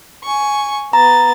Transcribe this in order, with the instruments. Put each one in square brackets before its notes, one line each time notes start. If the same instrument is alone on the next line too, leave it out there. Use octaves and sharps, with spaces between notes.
[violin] G#5 C#6
[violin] B3 A6 [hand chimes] A#5